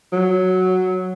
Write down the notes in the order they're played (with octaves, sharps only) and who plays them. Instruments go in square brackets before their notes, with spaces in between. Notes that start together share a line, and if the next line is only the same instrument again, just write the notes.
[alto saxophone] F#3